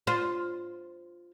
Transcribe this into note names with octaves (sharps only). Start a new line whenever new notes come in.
F4 C5